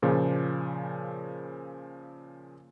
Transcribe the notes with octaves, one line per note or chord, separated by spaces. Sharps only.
A#2 C#3 F3